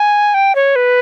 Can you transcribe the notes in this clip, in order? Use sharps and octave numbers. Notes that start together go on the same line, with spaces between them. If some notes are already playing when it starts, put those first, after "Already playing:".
Already playing: G#5
G5
C#5
B4